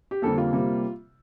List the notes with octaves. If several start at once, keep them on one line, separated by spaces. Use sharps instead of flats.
G4
F2 D3 G3 A#3 A4
F4
C3 G3 A#3